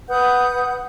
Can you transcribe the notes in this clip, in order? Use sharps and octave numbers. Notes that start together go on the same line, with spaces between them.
B4 F#5 D#6 G6